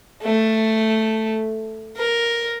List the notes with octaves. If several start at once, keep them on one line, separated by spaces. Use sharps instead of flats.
A3
A#4